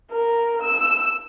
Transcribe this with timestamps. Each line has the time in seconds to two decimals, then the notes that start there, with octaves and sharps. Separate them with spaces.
0.11 A#4
0.63 E6